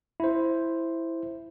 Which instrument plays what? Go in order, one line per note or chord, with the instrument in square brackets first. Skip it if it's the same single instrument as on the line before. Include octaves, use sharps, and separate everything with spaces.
[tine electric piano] E4 C5